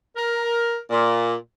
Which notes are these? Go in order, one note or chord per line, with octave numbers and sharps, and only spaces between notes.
A#4
A#2